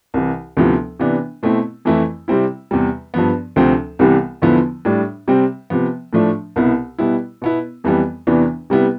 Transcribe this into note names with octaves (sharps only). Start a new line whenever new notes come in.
C2 C3 E3
D2 C3 F3 B3 E4
C3 E3 B3 D4
B2 A3 C4 E4
F2 E3 A3 E4
C3 G3 C4 E4
E2 C3 G3
G2 F3 B3
D2 C3 F3 C4
C2 C3 E3 G3 B3
E2 D3 F3 B3 E4
A2 G3 D4
C3 G3 C4
C3 F3 B3
A2 F3 A3 D4
C2 B2 B3 E4
B2 G3 B3 E4
B2 B3 E4
F2 E3 G3 B3
E2 C3 E3 B3 D4
C3 G3 B3 E4